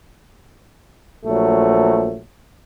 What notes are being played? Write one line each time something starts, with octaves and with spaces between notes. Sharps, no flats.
A#1 F#3 A3